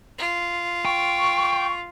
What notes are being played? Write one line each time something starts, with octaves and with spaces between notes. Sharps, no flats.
F4
G5 C#6